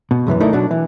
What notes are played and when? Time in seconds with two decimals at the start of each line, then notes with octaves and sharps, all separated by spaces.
0.11 B2
0.27 C#2 F#2 E3 B3
0.40 D2 A3 D#4 E4 A#4 D5
0.53 B2 F#3 D4
0.71 E3